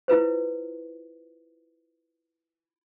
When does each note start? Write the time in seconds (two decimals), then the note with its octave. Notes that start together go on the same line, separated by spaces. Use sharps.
0.08 E4 F4 B4 C5